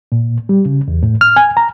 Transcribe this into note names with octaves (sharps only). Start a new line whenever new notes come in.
A#2
G3
C#3
E2
A2
F6
G#5
A#5